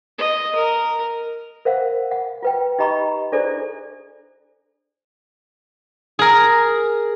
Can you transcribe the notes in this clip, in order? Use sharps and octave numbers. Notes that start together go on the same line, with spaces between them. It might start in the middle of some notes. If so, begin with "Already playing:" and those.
D#5
A#4
A#4 C5 F5 F#5
F#5
F4 B4 G5
D#4 G4 D#5 A#5 B5 C#6
D4 E4 G#4 A4 C5 D5
G#4 A#4